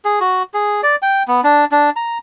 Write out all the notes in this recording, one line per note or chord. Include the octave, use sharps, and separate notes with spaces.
G#4
F#4
G#4
D5
G5
B3
D4
D4
A#5